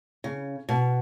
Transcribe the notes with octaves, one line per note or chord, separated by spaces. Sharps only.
C#3
B2